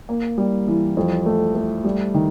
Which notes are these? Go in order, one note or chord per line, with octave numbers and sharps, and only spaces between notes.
A#3
G3
E3
F2
A3
A3
G3
D#3